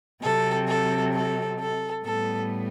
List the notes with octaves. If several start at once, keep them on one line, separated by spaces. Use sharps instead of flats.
C3 F#3 C4 A4
A4
A4
A4
A2 G3 B3 A4